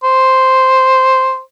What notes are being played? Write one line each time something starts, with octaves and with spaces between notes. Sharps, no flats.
C5